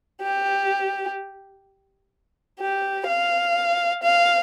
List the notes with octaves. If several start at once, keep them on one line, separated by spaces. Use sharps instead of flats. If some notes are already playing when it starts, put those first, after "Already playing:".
G4
G4
F5
F5